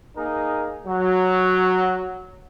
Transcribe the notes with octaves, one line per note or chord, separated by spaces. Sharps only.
A#3 D#4 G#4 A#4
F#3